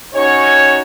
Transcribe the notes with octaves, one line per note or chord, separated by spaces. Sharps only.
C#4 D#4 F#4 C#5